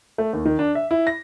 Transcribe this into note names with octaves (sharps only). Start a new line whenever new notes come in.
A3
D#2
D#3
D4
E5
E4
A#6